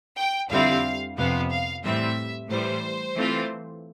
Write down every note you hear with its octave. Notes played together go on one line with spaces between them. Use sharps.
G5
F2 D3 G3 C4 E4 F5
F2 C3 F3 B3 F5
F5
A2 E3 G3 C4 E5
A2 E3 G3 C5
E3 A3 C4 F4